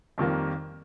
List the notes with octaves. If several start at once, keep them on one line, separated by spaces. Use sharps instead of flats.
F2 D#3 G3 A#3